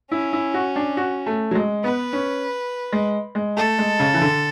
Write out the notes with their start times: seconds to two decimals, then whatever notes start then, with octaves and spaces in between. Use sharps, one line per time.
0.11 C#4 E4
0.33 E4
0.54 F#4
0.76 D4
0.97 F#4
1.26 A3
1.51 F#3
1.55 G#3
1.83 B3 B4
2.13 C#4
2.93 G#3
3.35 G#3
3.57 A3 A4
3.79 G#3
4.00 C#3
4.14 E3
4.21 D3